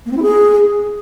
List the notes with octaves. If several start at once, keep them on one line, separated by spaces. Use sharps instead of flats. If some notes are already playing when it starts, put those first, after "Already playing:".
A#3
C4
E4
G#4